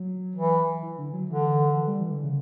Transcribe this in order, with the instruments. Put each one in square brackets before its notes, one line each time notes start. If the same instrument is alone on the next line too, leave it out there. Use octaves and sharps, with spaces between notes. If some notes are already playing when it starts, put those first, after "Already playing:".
Already playing: [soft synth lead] F#3
[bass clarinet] E3
[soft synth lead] E3
D3
F#3
[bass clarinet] D3 [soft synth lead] E3
[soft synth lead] E3
G3
E3
D3
C#3